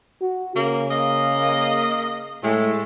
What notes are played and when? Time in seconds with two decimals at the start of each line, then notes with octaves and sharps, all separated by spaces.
0.21 F#4
0.55 C#3 A#3
0.91 A#3 D#5
2.43 A2 G#3 A3